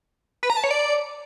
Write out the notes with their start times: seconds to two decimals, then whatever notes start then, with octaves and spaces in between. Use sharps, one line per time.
0.43 B4
0.50 A#5
0.57 A5
0.64 C#5
0.71 D5